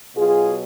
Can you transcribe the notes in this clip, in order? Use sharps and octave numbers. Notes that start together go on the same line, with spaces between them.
B2 F#3 F4 G#4